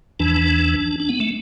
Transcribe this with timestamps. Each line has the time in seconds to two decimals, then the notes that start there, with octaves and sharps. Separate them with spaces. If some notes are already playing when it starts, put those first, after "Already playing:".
0.20 E2 E3 D4
1.00 D4
1.09 B3
1.20 A3